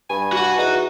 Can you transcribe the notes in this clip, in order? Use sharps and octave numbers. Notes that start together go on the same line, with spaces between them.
G2 G#5
F#4 F#5
E2 D#4